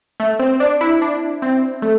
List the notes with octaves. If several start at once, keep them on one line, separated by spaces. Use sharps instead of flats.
A3
C4
D4
E4
D4
C4
A3